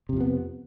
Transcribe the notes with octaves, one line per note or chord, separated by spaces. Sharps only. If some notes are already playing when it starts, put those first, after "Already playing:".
F2 C3 F3 B3